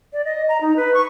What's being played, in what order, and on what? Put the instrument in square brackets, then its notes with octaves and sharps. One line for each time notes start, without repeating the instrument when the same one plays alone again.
[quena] D5
D#5
A#5
D#4
B4
C#6